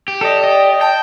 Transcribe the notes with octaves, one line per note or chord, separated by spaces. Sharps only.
G4
A4 D5 D#5
D#5
G5 A5